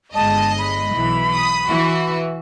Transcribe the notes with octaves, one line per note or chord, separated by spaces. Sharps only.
G1 G#3 D#5 A5
B5
B1 E3
D#6
E3 F#4